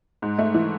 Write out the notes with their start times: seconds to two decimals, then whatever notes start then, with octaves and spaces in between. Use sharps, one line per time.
0.22 G#2
0.38 A3
0.54 E3